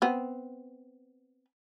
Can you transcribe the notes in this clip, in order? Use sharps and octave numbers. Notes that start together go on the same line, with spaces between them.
B3 C4